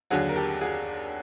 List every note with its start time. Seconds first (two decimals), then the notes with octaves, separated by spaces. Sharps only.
0.10 D#2 D3 F#3 F#4 G#4
0.29 A#4
0.36 G4 A4
0.61 F#4 G#4